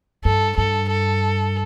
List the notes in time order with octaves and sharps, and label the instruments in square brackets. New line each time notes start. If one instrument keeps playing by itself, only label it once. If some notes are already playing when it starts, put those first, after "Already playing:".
[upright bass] G2 [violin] A4
[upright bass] G2 [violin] A4
[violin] A4